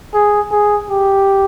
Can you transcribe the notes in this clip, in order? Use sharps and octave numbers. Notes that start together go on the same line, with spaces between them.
G#4
G#4
G4